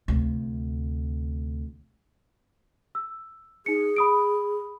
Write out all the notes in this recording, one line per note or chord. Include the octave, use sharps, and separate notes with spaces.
D2 C3
E6
D#4 G#4 C#7
B5 D#6 D7